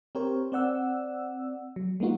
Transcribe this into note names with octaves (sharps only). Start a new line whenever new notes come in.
C4 G4 A#4 C5 C#5
C4 D5 F#5 E6
F#3
G#3 A#3 B3 D#4 F4 F#4